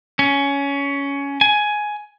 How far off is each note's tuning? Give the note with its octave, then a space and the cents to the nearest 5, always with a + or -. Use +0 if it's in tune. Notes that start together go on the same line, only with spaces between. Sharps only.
C#4 +15
G#5 +10